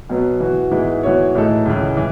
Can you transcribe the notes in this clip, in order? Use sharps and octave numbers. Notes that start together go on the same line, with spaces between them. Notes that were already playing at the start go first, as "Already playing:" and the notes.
B2 F#3 B3
E3 B3 F#4
G#2 E3 G#3 B3 E4
E3 B3 F#4 C#5
A2 E3 G#3 D#4 A4
C#2 C#3 E3
E3